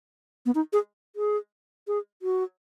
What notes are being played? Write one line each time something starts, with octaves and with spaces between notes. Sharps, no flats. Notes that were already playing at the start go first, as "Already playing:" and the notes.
B3
D#4
G#4
G#4
G#4
F#4